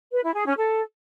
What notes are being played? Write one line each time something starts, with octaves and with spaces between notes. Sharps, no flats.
B4
E4
G#4
C#4
A4